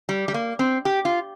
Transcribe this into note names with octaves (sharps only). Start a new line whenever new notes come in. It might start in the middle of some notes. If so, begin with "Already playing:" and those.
G3
G3
A#3
C4
G4
F4